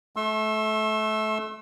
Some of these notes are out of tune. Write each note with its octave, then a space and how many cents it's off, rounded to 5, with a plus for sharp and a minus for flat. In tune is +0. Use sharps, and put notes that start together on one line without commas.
A3 -25 C6 +45 E6 +0